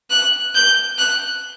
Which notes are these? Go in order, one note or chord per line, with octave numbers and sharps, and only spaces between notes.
F#6
G6
F#6